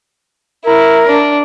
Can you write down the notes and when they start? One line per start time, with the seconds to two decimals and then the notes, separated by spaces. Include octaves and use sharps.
0.65 E4 A#4
1.07 D4